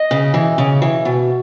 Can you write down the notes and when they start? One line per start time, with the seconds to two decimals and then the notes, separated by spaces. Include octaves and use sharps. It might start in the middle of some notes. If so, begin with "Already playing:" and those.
Already playing: D#5
0.11 C#3
0.34 E3
0.58 C#3
0.82 E3
1.05 B2